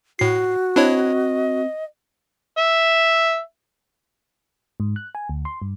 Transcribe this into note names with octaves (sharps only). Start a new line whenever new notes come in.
A2 F#4 C7
C4 D4 E4 C#5 D#5
E5
G#2
F#6
G#5
D2
C6
G2